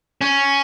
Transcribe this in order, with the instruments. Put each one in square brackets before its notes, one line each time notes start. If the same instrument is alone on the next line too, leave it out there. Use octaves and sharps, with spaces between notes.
[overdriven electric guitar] C#4